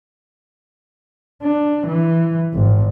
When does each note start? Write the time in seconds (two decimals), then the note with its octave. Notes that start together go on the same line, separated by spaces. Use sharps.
1.43 D4
1.87 E3
2.54 G#1